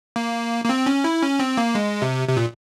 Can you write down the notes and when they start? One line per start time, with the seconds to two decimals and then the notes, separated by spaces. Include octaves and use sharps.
0.16 A#3
0.65 A#3
0.69 C4
0.86 C#4
1.04 E4
1.22 C#4
1.39 C4
1.57 A#3
1.75 G#3
2.02 C3
2.28 C3
2.37 A#2